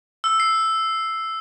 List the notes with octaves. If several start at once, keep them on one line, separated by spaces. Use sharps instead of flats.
E6
C7